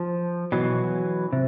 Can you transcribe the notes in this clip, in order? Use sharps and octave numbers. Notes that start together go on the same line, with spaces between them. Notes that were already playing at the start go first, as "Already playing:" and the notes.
Already playing: F3
B2 E3 F#3
C3